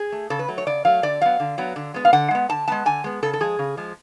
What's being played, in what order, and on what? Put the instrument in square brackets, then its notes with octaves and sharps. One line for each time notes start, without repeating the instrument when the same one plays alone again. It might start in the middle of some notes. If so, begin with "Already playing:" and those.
Already playing: [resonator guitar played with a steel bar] G#4
A3
C#3 A4
B4
F#3 A3
C#5
C#3 D5
F#3 A3 F5
D3 D5
F#3 B3 F5
D3
F#3 B3
D3
G#3 B3
F5
D3 F#5
G#3 B3
D3 A5
G#3 B3 A5
D3 G#5
G#3 B3
C#3 A4
A4
F3 G#3 G#4
C#3
F3 G#3